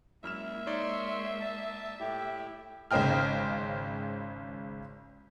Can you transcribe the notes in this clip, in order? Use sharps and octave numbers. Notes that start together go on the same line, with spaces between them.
F#2 G#3 A#3 E4 E5 F6 E7
D#4 C#5 D5 C6
A5
A2 E4 G4
G#1 C#3 C5 D#5 G5 F6